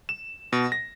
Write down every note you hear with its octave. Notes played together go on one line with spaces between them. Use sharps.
E7
B2
A#6